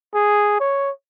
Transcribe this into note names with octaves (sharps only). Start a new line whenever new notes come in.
G#4
C#5